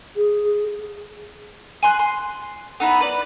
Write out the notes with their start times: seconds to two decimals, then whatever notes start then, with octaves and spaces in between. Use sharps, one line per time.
0.17 G#4
1.83 G#5 C6 F#6
1.99 C6
2.80 B3 D#4 E4 B5
3.00 B4 D5